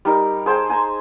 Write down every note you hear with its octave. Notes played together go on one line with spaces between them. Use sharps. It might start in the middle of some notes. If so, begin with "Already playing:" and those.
G3 D#4 A#4
G#4 C5 G5 A5
G#5 A#5 C6